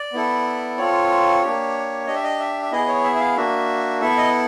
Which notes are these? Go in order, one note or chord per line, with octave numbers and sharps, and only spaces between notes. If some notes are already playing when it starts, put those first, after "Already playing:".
Already playing: D5
B3 E4 A4
C4 F4 A4 C#5
A#3 D4 G4
D4 G4 D#5
E5
D#5
E5
E5
B3 E4 G#4 D#5
C#5
E5
E5
F5
A#3 D4 F#4 E5
B3 E4 A4 E5
D#5